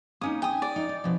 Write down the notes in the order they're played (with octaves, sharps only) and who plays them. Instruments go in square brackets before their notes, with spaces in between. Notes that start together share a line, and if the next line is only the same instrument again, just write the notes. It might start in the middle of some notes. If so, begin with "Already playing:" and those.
[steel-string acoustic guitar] A#3 C#4 D#4 [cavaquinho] D#6
[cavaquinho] G5 D#6 [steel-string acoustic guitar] G#5
[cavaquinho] D5
[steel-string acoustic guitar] D#4 F4
D#4
B2 F3